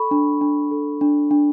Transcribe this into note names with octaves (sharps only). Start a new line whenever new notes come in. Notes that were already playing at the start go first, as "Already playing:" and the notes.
Already playing: A4 B5 C#6
D4
D4
A4
D4
D4